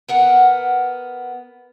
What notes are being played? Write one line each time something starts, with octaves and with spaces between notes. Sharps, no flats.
B3 A#4 F#5